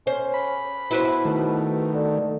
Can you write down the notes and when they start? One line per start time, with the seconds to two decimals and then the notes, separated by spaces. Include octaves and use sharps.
0.07 C#4 C5
0.34 B5
0.91 B2 E4 B4 C5
1.25 D#3 A3
1.94 D3